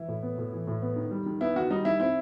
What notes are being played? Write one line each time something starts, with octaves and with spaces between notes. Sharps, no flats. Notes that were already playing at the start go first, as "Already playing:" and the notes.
Already playing: E3 E4
A2
B3
A2
E3
A2
B3
D#3
G3
D#3
B3 E4
D#3 F#4
G3 D#4
D#3 E4
C4 E4